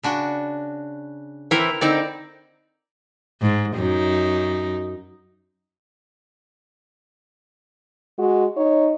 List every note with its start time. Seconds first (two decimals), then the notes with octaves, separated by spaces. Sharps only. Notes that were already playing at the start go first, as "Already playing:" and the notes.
0.03 C#3 D4 F#4
1.51 E3 C4 E4 A#4
1.81 D3 C4 D#4 D5
3.41 G#2
3.77 F#2 D#4
8.19 G#3 F#4
8.57 D#4 C#5